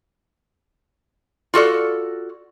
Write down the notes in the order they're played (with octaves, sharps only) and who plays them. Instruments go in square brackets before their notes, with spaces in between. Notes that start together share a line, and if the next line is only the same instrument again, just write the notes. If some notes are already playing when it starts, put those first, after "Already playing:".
[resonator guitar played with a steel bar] F4 F#4 A4 D5